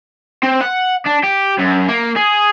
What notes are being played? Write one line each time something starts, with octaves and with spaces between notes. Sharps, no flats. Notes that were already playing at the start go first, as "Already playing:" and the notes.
C4
F#5
D4
G4
F#2
A#3
G#4